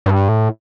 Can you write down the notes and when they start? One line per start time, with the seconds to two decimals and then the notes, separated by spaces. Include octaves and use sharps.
0.06 G2
0.29 A2